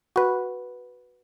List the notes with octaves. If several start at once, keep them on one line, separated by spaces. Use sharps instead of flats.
F#4 B4